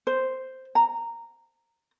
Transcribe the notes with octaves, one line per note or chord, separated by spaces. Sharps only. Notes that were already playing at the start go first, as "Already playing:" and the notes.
C5
A#5